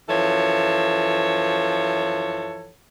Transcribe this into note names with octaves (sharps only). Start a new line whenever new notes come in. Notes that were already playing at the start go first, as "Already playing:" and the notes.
F#2 E3 F3 A4 C#5